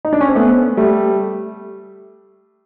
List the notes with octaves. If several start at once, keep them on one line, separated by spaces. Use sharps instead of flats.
D#4
D4
C#4
C4
A3 B3
G3 A3